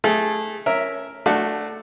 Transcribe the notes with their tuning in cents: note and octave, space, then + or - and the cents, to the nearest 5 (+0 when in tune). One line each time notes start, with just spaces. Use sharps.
A3 -20 G#4 -20
C#4 +0 A#4 +0 E5 -5
A3 +0 D4 +15 F#4 +0